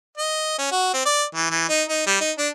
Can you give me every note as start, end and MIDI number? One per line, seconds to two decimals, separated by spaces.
0.18 0.56 75
0.59 0.68 61
0.71 0.89 66
0.94 1.01 60
1.06 1.24 74
1.35 1.49 52
1.51 1.66 52
1.69 1.83 63
1.89 2.06 63
2.07 2.20 55
2.21 2.31 63
2.38 2.49 62